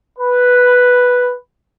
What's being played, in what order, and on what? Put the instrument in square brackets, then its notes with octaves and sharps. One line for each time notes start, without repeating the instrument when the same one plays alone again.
[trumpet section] B4